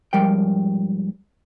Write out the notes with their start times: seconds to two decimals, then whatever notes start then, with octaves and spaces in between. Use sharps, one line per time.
0.13 G#2 F3 G3 A#4 G5